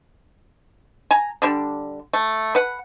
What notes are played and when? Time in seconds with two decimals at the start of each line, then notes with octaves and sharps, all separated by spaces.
1.11 G#5 A#5
1.42 D3 G3 D4
2.13 A3
2.55 B4 F#5